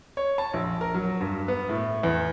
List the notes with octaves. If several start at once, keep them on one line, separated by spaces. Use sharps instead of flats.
C#5
A5
A#1
A#4
F#3
G2
B3
A2
E2